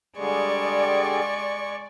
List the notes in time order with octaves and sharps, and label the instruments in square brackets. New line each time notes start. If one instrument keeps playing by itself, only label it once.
[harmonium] D3 G3 G#4 [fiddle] G#3 C#6 [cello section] D5